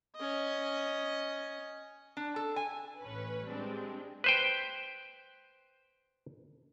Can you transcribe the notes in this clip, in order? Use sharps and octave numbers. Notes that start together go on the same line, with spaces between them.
C#4 D#5
D4
A4
G#5
A1 C#4 B4
G3 G#3 C4 D4
B4 C5 G5